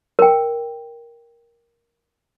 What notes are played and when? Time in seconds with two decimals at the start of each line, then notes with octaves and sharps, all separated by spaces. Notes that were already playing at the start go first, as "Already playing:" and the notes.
0.19 A#4 G5